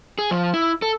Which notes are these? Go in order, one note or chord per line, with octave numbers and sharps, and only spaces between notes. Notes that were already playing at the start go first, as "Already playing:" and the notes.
G#4
F3
E4
A4